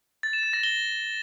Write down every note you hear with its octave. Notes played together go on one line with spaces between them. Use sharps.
A6
E7
A6
A#6
G7